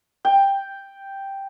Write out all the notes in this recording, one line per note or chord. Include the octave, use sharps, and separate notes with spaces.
G5